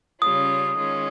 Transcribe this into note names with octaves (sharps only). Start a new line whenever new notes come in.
C#3 G3 C#4 F4 D#6
D#3 G#3 C#4 F4